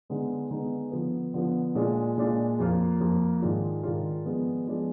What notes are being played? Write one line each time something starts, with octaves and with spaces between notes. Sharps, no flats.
D3 G#3 B3 D#4
D3 G#3 B3 D#4
D3 F3 B3
D3 F3 B3
A#2 G#3 D4 F4
A#2 G#3 D4 F4
F2 F3 A#3 F4
F2 F3 A#3 F4
G#2 D#3 G#3 D4 F4
G#2 D#3 G#3 D4 F4
F3 G#3 B3 D4
F3 G#3 B3 D4